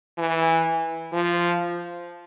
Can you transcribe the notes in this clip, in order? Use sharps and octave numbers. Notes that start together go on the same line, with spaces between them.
E3
F3